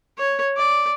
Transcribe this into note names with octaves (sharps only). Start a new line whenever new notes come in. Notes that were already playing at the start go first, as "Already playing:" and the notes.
C#5
D5